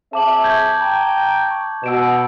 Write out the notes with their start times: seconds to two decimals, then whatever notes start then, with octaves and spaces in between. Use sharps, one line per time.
0.13 C4 G#4 E5 A5 D6 F#7
0.43 C#6 G6 G#6
0.80 G5 A#5
1.51 C#6
1.84 B2 E6 D7 E7